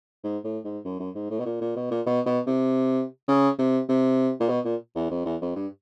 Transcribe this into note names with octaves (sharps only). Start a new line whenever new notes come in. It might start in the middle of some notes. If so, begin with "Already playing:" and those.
G#2
A2
G#2
F#2
F#2
G#2
A2
B2
A#2
A#2
B2
A#2
B2
B2
C3
C#3
C3
C3
A#2
B2
A#2
E2
F2
E2
F2
G2